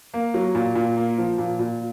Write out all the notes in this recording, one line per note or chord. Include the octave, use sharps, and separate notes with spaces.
A#3
F#3
A#2
A#2
A#3
F3
A#2
A#2